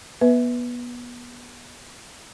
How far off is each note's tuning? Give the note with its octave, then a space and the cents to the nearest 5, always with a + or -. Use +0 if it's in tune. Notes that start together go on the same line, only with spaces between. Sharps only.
B3 -25 B4 +0 E5 -10